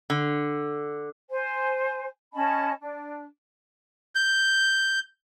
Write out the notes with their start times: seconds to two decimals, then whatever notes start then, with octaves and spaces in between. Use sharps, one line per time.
0.10 D3
1.30 C5 G#5
2.33 C#4 D#5 A5 B5
2.80 D4
4.15 G6